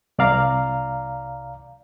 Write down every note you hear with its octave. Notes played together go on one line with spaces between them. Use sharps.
C2 D5 F5 A#5